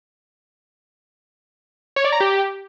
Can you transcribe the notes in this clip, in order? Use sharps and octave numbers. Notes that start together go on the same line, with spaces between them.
C#5
D5
A#5
G4